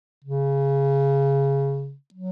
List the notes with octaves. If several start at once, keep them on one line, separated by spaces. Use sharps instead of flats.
C#3
F#3